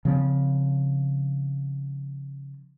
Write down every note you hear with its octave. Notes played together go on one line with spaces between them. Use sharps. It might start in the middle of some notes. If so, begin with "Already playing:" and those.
C#3 F3 C4